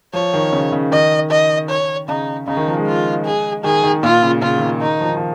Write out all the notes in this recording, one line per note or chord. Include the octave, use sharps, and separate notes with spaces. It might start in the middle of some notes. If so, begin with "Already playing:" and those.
F3 C#5
D#3
C#3
C#3
D#3 D#5
D#5
C#5
C#3 D#4
C#3 D#4
D#3
F3
G#3
F4
G#4
D#3 G#4
D#3
A#2 F4
C#3
C#3 F4
D#3
C#3
D#3 D#4
F3
D#3
F3